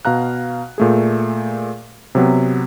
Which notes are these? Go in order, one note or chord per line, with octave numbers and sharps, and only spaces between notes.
B2 F5 A#5 F#6
A#2 A3 G#4
C3 F#3 B3